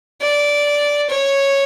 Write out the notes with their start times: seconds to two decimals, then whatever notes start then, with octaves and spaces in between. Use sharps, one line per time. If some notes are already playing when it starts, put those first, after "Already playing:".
0.21 D5
1.09 C#5